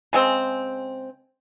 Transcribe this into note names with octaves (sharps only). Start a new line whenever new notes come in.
C#3 G#3 C4